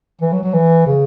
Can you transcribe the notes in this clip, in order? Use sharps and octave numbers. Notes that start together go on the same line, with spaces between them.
E3
F#3
F#3
E3
C#3